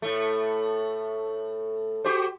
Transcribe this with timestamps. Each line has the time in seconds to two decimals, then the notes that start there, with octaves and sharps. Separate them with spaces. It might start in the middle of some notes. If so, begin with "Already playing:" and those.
0.02 A2 A3
2.04 F#4 G4 C5